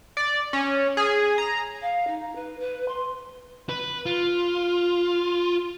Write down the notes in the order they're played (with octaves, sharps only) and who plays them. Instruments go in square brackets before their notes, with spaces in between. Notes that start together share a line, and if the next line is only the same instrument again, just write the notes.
[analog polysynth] D5
C#4
G#4
A#5
[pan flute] F5
D#4
B4
B4
C6
[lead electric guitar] B4
F4